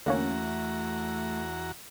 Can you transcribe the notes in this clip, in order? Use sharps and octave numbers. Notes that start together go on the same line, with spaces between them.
E2 D3 A3 A#3 C#4 F#4 A#5